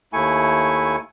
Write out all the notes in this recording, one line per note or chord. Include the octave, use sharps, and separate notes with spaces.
D#2 A3 E4 G#5 C#6